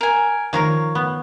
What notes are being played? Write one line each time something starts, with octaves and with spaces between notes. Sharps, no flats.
A#4 G#5
D#3 F3 A#4 C#5 F5
B3